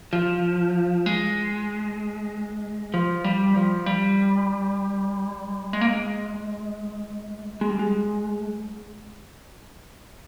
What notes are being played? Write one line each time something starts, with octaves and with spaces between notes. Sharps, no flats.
F3
G#3
F3
G3
F3
G3
G#3
A#3
G#3
G#3
G3
G#3